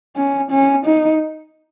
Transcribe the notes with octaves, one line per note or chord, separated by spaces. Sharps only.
C#4
C#4
D#4